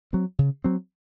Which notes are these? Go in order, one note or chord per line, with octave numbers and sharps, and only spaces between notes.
F#3 C4
C#3
F#3 C4